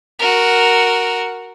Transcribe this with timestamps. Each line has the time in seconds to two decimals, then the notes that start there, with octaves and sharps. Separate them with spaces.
0.19 F#4 A#4